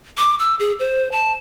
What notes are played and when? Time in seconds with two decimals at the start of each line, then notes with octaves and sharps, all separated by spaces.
0.18 D6
0.39 E6
0.60 G#4
0.79 C5
1.12 A5